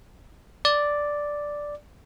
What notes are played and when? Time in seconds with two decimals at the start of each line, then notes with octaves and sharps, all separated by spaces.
0.65 D5